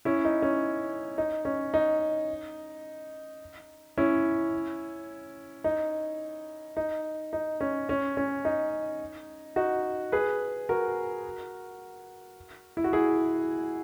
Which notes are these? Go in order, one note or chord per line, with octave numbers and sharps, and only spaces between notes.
C#4 E4
D#4
C#4
D#4
C#4
D#4
C#4 E4
D#4
D#4
D#4
C#4
C#4
C#4
D#4
D#4 F#4
G#4 B4
F#4 A#4
E4
F#4
E4 G#4